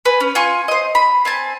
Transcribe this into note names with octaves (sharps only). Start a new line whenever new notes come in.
B4 G#5
C#4
F4 G#5 C#6
C5 D#5
B5
C4 G#5 A5